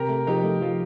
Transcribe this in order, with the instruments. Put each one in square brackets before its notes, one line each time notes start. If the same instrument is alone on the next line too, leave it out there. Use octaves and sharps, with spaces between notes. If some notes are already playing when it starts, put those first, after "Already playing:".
Already playing: [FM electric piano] C3 [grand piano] G4 A#4
[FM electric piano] A3
[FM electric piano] F3 [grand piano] D#4 G4
[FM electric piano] A3
[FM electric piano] F3 [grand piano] F4